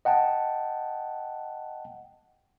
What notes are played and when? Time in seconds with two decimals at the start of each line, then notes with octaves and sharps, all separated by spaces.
0.05 D#5 F#5 G5 A5